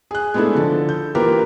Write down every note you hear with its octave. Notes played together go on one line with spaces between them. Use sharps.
G#4 F#6
G#3 A3 B3 D4 E4 A4
D3 F3 A4
G6
E3 A#3 F4 G4 A#4 B4